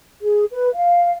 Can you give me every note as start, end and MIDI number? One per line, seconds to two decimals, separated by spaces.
0.23 0.44 68
0.52 0.68 71
0.74 1.15 77